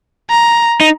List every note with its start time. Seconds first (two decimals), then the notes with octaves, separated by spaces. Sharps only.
0.30 A#5
0.81 D#4